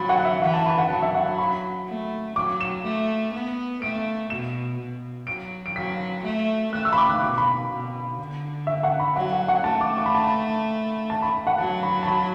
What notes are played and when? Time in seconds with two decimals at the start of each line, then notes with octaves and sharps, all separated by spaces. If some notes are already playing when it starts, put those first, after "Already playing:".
Already playing: F#3 B5 A6
0.09 F#5
0.25 E5
0.42 E3 F#5
0.54 A5
0.66 B5
0.78 F#5
0.90 F#3 A5
1.03 E5
1.14 F#5
1.38 B5
1.88 A3
2.36 F#3 D6
2.61 E7
2.84 A3
3.33 B3
3.82 A3 D7
4.30 B2 E7
4.79 B2
5.27 F#3 D7
5.66 D7
5.76 F#3 B6
6.24 A3
6.73 A3 F#6
6.85 E6
6.93 B5
6.97 D6
7.10 F#6
7.21 B2 D6
7.38 B5
7.70 B2
8.19 D3
8.67 E5
8.83 F#5
9.00 B5
9.16 F#3 F#5
9.33 F#5
9.48 F#5
9.64 A3 A5
9.81 D6
9.97 D6
10.06 B5
10.15 A5
10.24 B5
11.10 A5
11.22 B5
11.47 F#5
11.58 F#3 A5
11.83 B5
12.03 A5
12.07 B5